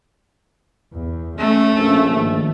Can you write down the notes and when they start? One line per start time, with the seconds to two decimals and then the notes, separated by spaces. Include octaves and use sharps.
0.93 E2
1.39 A3 C#4
1.77 A#1 A#3 C#4
2.13 G#2 D#3